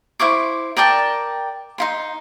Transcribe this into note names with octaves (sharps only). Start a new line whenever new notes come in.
E4 C5 C#6 D6
A#4 D5 G5 A5
D#4 E4 C6